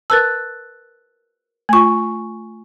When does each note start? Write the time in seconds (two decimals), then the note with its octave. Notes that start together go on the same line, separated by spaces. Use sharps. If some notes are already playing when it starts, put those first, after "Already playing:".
0.10 A#4 B4 A5 E6 F#6 A6
1.69 A3 F4 G#5 C#6